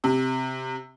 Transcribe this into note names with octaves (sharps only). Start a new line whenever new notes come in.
C3